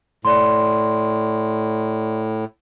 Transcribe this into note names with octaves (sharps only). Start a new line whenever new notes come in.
A2 D5 C6